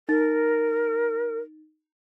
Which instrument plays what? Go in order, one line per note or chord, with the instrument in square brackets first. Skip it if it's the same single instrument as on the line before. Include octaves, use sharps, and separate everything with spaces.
[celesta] D#4 A6 [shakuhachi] A#4